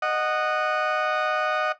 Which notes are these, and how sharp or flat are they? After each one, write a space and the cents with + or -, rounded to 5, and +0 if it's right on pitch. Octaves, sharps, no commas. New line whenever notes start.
D#5 -15 F#5 +0